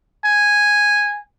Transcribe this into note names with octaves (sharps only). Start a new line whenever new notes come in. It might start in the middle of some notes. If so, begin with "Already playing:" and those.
G#5